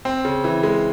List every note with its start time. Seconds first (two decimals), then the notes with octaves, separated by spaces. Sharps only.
0.05 C4
0.25 C#3
0.44 E3
0.63 G#3